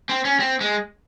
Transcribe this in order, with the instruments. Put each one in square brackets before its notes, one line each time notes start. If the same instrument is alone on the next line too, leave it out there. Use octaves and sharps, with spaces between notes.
[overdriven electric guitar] C4
C#4
C4
G#3